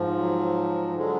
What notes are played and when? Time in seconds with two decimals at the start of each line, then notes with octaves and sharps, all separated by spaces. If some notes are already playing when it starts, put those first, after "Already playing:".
Already playing: G#2 F3
0.18 F#3
0.95 D3 F#3 G#3